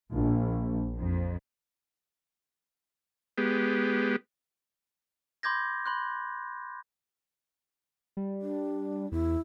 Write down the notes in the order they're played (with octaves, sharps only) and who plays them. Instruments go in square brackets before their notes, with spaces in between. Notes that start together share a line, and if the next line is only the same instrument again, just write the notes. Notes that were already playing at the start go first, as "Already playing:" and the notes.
[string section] A#1
F2
[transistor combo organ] G#3 B3 G4
[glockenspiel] B5 C6 D6 G6 G#6 A#6
B5 C6 F#6
[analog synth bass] G3
[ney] D4
[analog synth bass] E2 [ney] E4